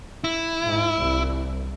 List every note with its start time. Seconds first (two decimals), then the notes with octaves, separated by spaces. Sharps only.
0.24 E4
0.62 G#2
0.96 C2